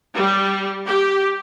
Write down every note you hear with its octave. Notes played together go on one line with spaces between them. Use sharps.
G3
G4